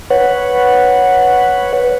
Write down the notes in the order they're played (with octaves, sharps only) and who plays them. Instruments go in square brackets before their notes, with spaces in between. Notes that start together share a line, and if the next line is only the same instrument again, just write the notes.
[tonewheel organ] B4 C#5 F#5